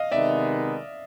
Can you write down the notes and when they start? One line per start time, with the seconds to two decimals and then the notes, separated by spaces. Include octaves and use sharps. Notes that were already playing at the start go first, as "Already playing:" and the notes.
Already playing: D#5 F5
0.11 C3 D#3 G#3 B3 D#4 D5 E5